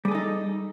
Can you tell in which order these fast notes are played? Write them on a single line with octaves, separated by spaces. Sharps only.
G3 G#4 A4 D#4